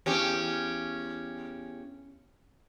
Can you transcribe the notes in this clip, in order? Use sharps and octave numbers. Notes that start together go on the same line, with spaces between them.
E2 C#4 G4